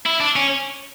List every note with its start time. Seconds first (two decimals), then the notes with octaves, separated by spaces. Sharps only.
0.06 E4
0.20 D4
0.36 C#4